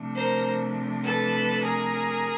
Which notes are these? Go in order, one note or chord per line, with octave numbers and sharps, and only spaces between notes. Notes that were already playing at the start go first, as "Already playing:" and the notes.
Already playing: C3 F3 A3 D4
A#4 C5
A4 B4
G#4 A#4